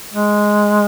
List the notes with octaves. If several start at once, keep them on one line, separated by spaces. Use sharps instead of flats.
G#3